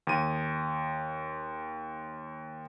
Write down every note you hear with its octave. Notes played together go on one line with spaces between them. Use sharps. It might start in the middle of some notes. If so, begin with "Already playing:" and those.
D#2 D#7